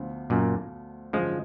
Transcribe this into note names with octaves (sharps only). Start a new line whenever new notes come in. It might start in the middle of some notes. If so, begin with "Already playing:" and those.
Already playing: D2 D3 F3 B3 F4
F#2 A#2
G#1 F#2 D3 F3 G#3